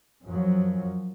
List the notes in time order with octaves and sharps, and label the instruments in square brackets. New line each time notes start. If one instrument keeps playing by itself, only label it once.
[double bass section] F#2 F3 F#3